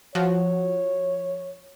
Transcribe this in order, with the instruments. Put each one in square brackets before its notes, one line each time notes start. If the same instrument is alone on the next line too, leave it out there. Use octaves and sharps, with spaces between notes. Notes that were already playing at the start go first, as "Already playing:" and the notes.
[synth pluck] F3 F#4 [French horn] C#5